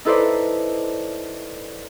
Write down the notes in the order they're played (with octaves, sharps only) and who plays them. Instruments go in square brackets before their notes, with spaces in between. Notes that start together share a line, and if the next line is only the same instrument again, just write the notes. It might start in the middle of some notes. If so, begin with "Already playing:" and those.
[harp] D#4 E4 A4 B4 C5 D5